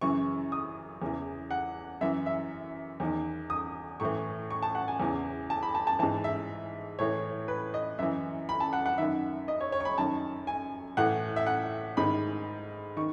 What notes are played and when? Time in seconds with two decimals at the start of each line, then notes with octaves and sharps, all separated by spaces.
0.01 F#2 C#3 E3 C#6
0.52 D#6
1.02 E2 C#3 E3
1.51 F#5
2.01 F#2 E3 E5
2.26 E5
3.00 E2 D#3
3.50 D#6
4.00 A2 E3 C#6
4.50 C#6
4.63 A5
4.75 F#5
4.88 G#5
5.00 E2 C#3 E3
5.50 A5
5.63 B5
5.75 A5
5.87 A5
5.99 G#2 E3 A5
6.24 E5
6.99 A2 E3 C#5
7.48 B4
7.74 D#5
7.99 F#2 E3 E5
8.49 B5
8.60 A5
8.73 F#5
8.86 F#5
8.98 F#2 D#3 E5
9.48 D#5
9.61 C#5
9.72 C#5
9.81 C#6
9.85 B5
9.98 F#2 D#3 A5
10.47 G#5
10.97 A2 E3 F#5
11.36 E5
11.46 F#5
11.97 G#2 D#3 B5
12.97 D#3 C#6